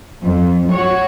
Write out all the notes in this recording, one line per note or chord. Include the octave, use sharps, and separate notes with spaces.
F2
F#4 C#5